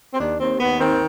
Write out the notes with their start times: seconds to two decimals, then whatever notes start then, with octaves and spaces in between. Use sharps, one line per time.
0.14 C4
0.20 D#2 D4
0.40 D#2 C4
0.60 D#2 B3
0.80 D#3 C4